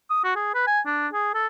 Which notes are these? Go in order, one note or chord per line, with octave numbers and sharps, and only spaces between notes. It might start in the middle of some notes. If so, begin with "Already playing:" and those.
D#6
F#4
G#4
B4
G#5
D4
G#4
A4